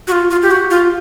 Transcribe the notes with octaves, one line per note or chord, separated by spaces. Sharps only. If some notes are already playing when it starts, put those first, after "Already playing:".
F#4
F4
F4
G4
F#4
F4